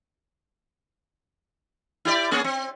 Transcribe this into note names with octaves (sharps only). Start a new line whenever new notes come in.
E4 G4 D5
A#3 C#4 G#4
C4